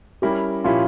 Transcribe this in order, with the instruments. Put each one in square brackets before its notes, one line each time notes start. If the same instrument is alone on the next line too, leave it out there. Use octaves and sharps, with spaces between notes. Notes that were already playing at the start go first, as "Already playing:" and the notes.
[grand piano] G3 C#4 E4 A#4 [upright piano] G4
[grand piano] A#2 F3 C#4 E4 G4 [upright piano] F4